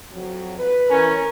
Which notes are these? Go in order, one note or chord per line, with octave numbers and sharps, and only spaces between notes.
F2 F#3
B4
E3 C#4 A#4